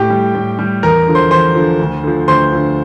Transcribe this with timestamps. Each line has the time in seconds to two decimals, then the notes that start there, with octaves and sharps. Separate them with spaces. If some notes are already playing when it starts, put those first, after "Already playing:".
Already playing: A2 G4 G5
0.10 G3
0.35 A2
0.59 G3
0.83 E2 A#4 A#5
1.07 D3 F3
1.15 C5 C6
1.31 E2 C5 C6
1.55 D3 F3
1.79 D2
2.03 D3 F3
2.28 D2 C5 C6
2.52 D3 F3